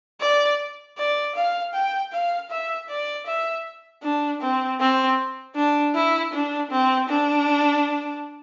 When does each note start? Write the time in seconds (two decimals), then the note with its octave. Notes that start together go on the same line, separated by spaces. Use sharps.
0.21 D5
0.98 D5
1.36 F5
1.74 G5
2.13 F5
2.51 E5
2.89 D5
3.27 E5
4.03 D4
4.42 C4
4.80 C4
5.56 D4
5.95 E4
6.33 D4
6.71 C4
7.09 D4